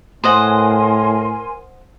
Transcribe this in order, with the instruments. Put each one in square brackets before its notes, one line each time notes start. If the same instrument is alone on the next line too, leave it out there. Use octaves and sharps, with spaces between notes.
[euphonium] A2 [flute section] A#4 G#5 C6 [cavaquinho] C5 D#5 F#5